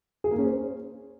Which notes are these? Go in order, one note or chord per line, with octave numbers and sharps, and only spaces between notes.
G#4
A#3
C#4
C5